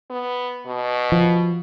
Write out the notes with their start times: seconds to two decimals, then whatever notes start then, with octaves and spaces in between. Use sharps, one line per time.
0.10 B3
0.66 B2
1.12 F3